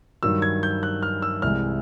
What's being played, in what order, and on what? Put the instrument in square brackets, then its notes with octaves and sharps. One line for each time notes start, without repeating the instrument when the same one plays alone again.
[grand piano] G2 D#3 F#3 E6
G#6
G6
F#6
F6
E6
C2 C3 E3 G#3 F6